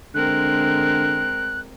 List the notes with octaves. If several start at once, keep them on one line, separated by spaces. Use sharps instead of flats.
D3 G#3 C4 A#4 F#6